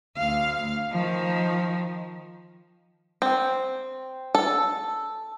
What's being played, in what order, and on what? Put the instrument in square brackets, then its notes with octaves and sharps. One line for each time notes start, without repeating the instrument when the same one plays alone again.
[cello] D2 F5
D#3 F3
[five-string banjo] C4
A4